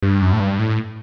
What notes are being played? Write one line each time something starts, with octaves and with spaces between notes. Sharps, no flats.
G2
F#2
A2
G2
A2